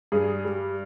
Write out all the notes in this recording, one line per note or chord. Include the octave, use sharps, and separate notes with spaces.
G2 G#4
G3